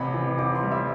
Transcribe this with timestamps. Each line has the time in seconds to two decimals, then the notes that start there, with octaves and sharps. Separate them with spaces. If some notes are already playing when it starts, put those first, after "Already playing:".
Already playing: A1 C3 B5
0.14 E3
0.38 A1 D6
0.55 C6
0.63 G3
0.72 E5